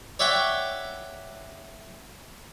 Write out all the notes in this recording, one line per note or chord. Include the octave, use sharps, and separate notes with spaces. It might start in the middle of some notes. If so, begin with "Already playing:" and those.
C#5 D5 E5 F#5 G5 D6